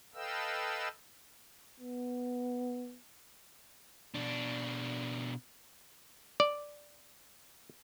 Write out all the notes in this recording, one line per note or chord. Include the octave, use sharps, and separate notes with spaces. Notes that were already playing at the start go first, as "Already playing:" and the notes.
A4 B4 D#5 F5 G5 E6
B3
B2 D4
D5